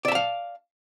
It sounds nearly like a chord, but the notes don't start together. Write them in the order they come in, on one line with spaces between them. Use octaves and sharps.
D5 E5 A5 F5